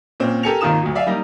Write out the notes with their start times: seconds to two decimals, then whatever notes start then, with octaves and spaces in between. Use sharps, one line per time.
0.20 A#2 C4 C#4
0.43 G4 A4 A#4 G#5 C#7 F7
0.61 G#1 D#3 A#3 F4 D#6 E7
0.83 D2 F#3
0.95 D5 E5 F5 G#5
1.07 G3 A#3 D#4